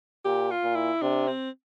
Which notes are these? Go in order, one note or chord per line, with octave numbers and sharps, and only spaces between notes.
A#2 G4
F4
A#2
E4
C3 D4
C4